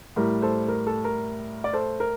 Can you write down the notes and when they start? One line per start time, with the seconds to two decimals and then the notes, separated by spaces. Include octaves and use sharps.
0.16 A2 G3 A#4
0.42 A4 C5
0.68 A#4
0.87 A4
1.05 A#4
1.64 D5
1.73 A4 C5
2.00 A#4